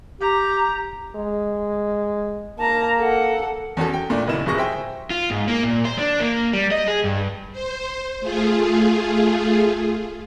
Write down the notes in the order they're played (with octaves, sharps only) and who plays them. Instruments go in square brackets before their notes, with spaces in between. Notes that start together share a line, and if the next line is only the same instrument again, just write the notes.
[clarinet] G4 [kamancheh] A#5
[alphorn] G#3
[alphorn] A#3 [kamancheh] A5 A#5
[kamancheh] A4 F#5
[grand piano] E2 C#4 F#4 A4
G5
A#2 A3 D4
F#1 D#2 B3 D#4 E4 E7
D1 F2 C3 G#4 C#6 A#6
C5 E5 G5 G#5
[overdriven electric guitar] F4
G#2
A#3
A#2
C5
D4
A#3
G3
D#5
G#4
G2
[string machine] C5
A3 F4 G#4